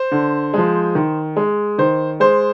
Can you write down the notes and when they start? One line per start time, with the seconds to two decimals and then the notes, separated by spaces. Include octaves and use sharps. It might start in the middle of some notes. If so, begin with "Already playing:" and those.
Already playing: C5
0.11 D3
0.54 F3 G#3
0.95 D#3
1.36 G#3
1.78 D#3 C5
2.20 G#3 C5